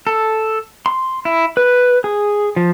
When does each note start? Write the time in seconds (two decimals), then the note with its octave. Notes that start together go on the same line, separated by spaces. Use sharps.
0.07 A4
0.86 C6
1.25 E4
1.57 B4
2.04 G#4
2.56 F3